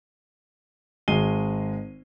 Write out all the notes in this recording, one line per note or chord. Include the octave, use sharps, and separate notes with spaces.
G#1 G#3 C7 D#7 G7